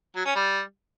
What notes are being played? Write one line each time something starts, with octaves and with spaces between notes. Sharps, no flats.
F#3
C#4
G3